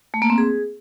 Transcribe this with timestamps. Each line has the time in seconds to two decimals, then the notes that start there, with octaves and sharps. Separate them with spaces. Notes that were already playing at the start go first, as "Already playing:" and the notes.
0.14 A3
0.22 A#3
0.30 C4
0.38 G#4